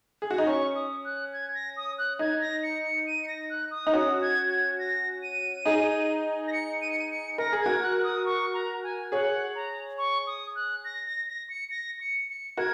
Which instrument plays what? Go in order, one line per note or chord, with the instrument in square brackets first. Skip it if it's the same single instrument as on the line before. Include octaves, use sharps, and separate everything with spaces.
[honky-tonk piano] G#4
F#4
D#4
[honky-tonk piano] C#4 [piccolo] C#6
[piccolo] D#6
F#6
G#6
A#6
D#6
F#6
[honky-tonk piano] D#4 [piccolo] G#6
[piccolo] A#6
C#7
C#7
D#7
C#7
A#6
F#6
D#6
[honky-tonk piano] D#4
[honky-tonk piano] C#4 F#4 [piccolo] D#6
[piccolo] G#6
G#6
A#6
D#7
[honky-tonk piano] D#4 G#4
[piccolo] A#6
C#7
D#7
C#7
D#7
C#7
[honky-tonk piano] A#4 [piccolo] A#6
[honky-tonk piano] G#4
[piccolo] G#6
[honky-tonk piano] F#4 A#4
[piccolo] F#6
F#6
D#6
C#6
A#5
G#5
[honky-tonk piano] G#4 C#5 [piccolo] F#5
[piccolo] A#5
C#6
D#6
F#6
A#6
A#6
A#6
C#7
A#6
C#7
C#7
[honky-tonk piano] F#4 A#4 [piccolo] G#6